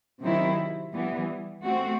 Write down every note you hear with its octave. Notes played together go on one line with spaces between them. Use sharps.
C3 D#3 F#3 C4 E4
E3 G3 B3
A3 C4 F#4